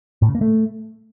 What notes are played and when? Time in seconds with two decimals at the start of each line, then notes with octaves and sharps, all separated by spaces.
0.22 A2
0.28 C#3
0.35 A#3
0.41 A3